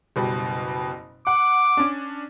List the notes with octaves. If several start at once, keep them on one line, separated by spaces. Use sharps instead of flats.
F#1 B2 G3
F#5 D6
C#4 D4